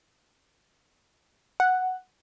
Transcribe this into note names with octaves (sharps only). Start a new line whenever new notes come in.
F#5